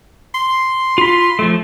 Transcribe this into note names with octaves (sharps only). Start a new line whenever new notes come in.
C6
F4 B5
F3 A3